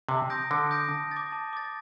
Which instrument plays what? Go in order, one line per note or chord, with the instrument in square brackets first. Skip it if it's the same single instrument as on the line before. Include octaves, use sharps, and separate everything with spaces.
[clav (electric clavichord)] C3 [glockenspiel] A5
[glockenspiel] D#6 G6 A#6 D7
[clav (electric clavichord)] D3 [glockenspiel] A5
[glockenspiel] D#6 G6 A#6 D7
A5
A6
D6
A5
D6 A6